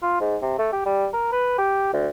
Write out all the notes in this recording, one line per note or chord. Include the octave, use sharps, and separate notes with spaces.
F4
G#2
C3
A3
G4
G3
A#4
B4
G4
D2